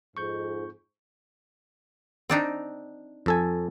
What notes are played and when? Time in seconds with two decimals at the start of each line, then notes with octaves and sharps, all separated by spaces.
0.17 F2 G#2 C#6 G6
2.30 C4 D4 D#4
3.26 F2 A4 G#5